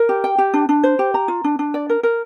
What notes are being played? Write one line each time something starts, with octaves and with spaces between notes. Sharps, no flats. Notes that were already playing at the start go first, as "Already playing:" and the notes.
Already playing: A#4
G4
G5
G4
D4
D4
C5
G4
A#5
F4
D4
D4
D5
A#4
A#4